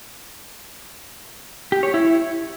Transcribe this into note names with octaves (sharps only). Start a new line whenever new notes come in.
G4
C#5
E4